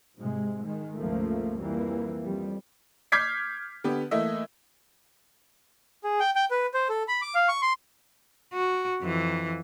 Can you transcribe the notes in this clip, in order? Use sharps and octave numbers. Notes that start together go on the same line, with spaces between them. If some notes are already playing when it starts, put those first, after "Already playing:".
G#2 C3 G#3
D#3 G#3
C#2 G2 F3 A3 A#3
F2 E3 G3 A#3
F2 G3
D6 F6 G6 G#6 B6 C7
D3 B3 G4
E3 A3 A#3 D#5 E5
G#4
G5
G5
B4
C5
A4
B5
D6
F5
C#6
C6
F#4
F2 E3